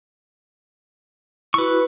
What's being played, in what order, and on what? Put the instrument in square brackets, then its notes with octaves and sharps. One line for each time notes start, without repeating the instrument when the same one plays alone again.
[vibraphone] E4 F#4 [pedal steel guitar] B4 C#6